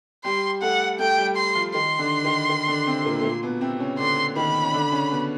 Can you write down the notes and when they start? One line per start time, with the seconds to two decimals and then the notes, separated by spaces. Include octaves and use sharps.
0.24 G3 G4 C6
0.62 A3 A4 F#5
0.99 A3 A4 G5
1.18 G3 G4
1.36 C6
1.55 F3 F4
1.74 D#3 D#4 C6
1.99 D3 D4
2.25 D#3 D#4
2.49 D#3 D#4
2.68 D3 D4
2.86 C3 C4
3.05 A#2 A#3
3.19 A3
3.23 A#2 A#3
3.43 B2 B3
3.61 C3 C4
3.80 C#3 C#4
3.99 D3 D4 C6
4.36 D#3 D#4 B5
4.63 C#4
4.73 D3 D4
4.92 C#3 C#4
5.11 B2 B3